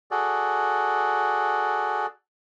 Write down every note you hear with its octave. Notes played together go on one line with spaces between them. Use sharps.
F#4 G#4 A4 D5